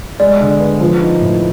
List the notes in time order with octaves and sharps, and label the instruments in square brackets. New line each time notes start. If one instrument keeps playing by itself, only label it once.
[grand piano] G#3 [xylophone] D5
[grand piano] D3
B3
F3
D#4
A2